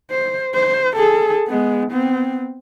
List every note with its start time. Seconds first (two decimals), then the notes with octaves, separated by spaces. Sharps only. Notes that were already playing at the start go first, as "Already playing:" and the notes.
0.11 C5
0.54 C5
0.96 G#4 A4
1.47 G#3 B3
1.91 B3 C4